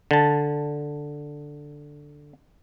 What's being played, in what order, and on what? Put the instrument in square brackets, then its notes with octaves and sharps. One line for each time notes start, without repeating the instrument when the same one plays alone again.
[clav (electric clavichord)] D3 A5